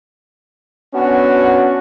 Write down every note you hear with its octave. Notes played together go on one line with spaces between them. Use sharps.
B3 C#4 D4 F#4